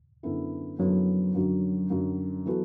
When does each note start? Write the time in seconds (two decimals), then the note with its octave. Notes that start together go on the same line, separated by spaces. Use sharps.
0.23 F#2 D3 B3 E4 A4
0.79 F#2 D3 F#3 B3 E4 A4
1.35 F#2 D3 F#3
1.90 F#2 D3 F#3
2.45 E3 B3 F#4 A4